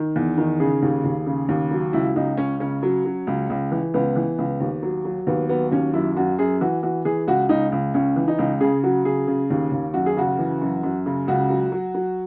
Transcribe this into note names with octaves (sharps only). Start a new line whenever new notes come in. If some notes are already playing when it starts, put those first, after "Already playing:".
Already playing: D#3
E2
D#3
C#3 G#4
D#2
D#2
C#3
D#2
F#3
C#2 E4
C#2 D#4
C#2 C#4
C#3 C#4
F#3
F#3
C#2
C#2
E3
C#2 B3
E3
C#2
D#2
F#3
F#3
D#2 B3
F#3 B3
D#2 C#4
F#2 E4
F#2 F#4
F#2 G#4
E3 F#4
E3 F#4
E3 G#4
C#2 F#4
C#2 D#4
C#2
C#2 C#4
E3
D#4
C#2
C#3 G#4
F#3 F#4
C#3 G#4
C#3
D#2
D#2
F#2 F#4
G#4
C#3 F#4
E3
F#2
F#2
C#3
C#2 F#4
F#3
F#3
F#3